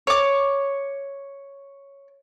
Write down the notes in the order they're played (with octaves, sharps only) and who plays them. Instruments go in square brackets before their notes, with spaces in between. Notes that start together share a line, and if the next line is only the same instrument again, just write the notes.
[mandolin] C#5 D6